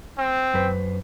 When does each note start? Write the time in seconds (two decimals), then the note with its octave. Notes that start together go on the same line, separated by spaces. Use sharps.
0.18 C4
0.54 F#2 B4 C5